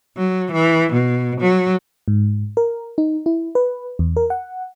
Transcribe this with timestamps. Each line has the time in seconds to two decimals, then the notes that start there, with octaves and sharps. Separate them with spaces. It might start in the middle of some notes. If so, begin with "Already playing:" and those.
0.17 F#3
0.52 E3
0.93 B2
1.41 F#3
2.08 G#2
2.57 A#4
2.98 D#4
3.26 E4
3.55 B4
3.99 E2
4.17 A#4
4.30 F#5